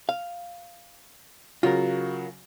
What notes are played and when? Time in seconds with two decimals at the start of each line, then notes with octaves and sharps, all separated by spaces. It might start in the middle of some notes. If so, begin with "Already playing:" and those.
0.09 F5
1.63 C#3 F#3 F4 F#4 A#4